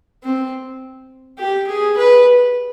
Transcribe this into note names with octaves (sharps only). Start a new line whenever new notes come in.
C4
G4
G#4
B4